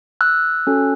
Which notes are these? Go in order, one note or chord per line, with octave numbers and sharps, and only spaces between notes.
E6 F#6
C#4 F#4 A4